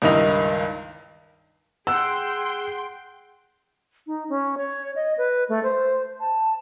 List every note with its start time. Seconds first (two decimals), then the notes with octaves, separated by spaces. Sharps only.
0.02 C#2 G2 D#3 E4 D#5 F7
1.87 G#4 F#5 G5 C6 E6
4.07 D#4
4.29 C#4
4.57 C#5
4.96 D#5
5.18 B4
5.49 A3
5.63 C5
6.20 A5